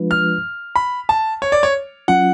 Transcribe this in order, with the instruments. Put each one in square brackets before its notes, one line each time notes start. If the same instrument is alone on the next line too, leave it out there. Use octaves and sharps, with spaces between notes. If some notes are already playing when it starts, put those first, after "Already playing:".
Already playing: [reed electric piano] F3 G#3 D4 F4 B4
[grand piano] F6
B5
A5
C#5
D5
C#5
[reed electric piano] F#3 C#4 F4 [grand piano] F#5